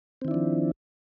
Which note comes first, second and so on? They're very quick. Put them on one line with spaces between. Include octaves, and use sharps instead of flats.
C4 D#3 E4 D4 F3